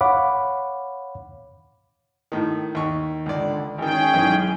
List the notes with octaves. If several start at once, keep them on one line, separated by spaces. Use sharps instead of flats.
C#5 F5 F#5 B5 D6
A2 D#3
D#2 C#6
C#2 D3 D5
G#1 D#3 C#4 G#4 G5
B1 G#2 E3